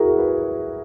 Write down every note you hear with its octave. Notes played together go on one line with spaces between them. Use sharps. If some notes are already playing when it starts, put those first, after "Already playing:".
Already playing: E4 F#4 G#4 A#4
B4